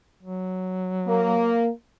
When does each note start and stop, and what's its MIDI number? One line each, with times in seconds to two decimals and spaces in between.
0.23 1.63 54
1.08 1.69 58